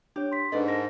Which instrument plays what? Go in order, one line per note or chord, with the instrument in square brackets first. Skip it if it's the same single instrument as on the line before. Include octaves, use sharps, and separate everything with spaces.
[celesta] D4 C#5 [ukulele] G4
[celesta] C6 B6
[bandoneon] G#2 [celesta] D4 A4 [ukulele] B4 D5 D#5
[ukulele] A4 A#4 [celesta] A#6